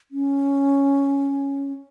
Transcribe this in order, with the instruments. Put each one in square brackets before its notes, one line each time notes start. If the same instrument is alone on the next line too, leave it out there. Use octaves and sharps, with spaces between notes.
[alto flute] C#4